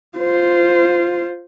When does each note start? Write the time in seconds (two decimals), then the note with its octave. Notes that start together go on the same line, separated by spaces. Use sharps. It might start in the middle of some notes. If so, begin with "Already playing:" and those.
0.18 F4 C5